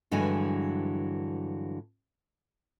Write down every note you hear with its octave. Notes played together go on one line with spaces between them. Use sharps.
G2 D3 E3 F#3 G#3 G#5